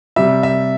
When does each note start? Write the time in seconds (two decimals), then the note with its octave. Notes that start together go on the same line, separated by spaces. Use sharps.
0.16 C3 G3 E5
0.43 E5